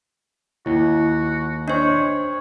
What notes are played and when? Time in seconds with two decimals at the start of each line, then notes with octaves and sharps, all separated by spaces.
0.66 D#2 E4 F#4
1.68 D4 C5 C#5 D#5 C#6